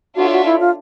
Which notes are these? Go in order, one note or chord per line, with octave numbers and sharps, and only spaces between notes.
D4 F4 F#4 A4 C#5 E5
F#4
E4
F4